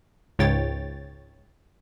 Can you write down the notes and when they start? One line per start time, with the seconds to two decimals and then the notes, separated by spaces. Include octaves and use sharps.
0.39 C#2 G#2 C#3 C#5 G5 A6